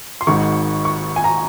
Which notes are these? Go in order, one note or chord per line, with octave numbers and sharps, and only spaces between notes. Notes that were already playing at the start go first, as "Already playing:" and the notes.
C6
G#1 G#2 D#3 C#6
C#6
G#5
A#5